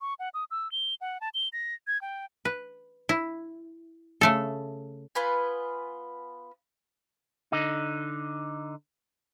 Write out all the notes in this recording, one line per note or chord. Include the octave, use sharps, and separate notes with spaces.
C#6
F#5
D#6
E6
G7
F#5
A5
G7
A#6
G#6
G5
B4
E4
C#3 A3 A4
B3 F4 B4 G#5
D3 D#4